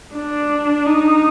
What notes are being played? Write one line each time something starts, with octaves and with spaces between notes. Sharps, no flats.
D4
D#4